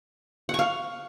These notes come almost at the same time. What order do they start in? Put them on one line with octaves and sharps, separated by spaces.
F#5 C#6 F5